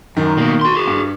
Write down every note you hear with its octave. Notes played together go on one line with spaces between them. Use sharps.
F#2 D#3
B2 A#3
F#4 C6
F#4 G#4
G2